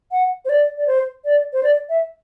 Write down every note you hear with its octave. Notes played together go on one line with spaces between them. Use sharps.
F#5
C5
D5
D5
C5
D5
C5
D5
E5